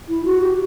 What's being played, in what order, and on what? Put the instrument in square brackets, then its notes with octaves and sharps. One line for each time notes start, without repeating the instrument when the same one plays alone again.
[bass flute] E4
F#4
G4